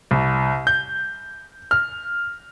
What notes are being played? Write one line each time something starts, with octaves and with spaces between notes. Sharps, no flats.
C2
G6
F6